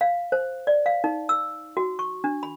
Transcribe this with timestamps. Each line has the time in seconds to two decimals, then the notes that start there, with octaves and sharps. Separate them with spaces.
0.01 F5
0.32 C5
0.67 D5
0.86 F5
1.04 D#4
1.29 E6
1.77 F#4
1.99 C#6
2.24 D4
2.43 B5